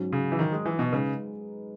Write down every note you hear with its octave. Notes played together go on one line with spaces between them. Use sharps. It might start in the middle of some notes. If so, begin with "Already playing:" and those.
Already playing: G#2 F#3 C#4 F#4
C#3
E3
D#3
G#3
E3
B2
C#3 G#3 D#4 G#4 B4